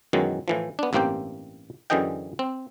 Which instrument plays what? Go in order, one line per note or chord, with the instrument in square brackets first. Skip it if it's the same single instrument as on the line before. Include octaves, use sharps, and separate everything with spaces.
[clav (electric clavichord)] F#2 B2 D#3 E3 F#3 G#3
A2 E3 F3
B3 D4
A1 G2 A#3 C4 G4 G5
F#2 D3 E3 G#4 D#5 G5
C4